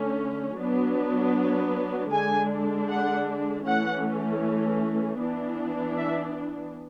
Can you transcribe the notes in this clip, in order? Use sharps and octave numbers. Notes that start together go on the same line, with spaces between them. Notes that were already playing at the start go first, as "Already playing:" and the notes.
Already playing: D3 A3 C#4
F#3 B3 D4
D3 G#3 D4 G#5
F#5
E3 A3 C#4 F#5
E3 B3 D4
E5